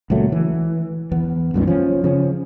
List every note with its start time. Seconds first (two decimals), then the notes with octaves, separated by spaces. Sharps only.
0.10 C#2 A#2 F#3 A3
0.32 E3
1.12 E2 B3
1.54 C2 F#2 A#2 D#3
1.67 F3 C#4
2.04 C#3 F3 C#4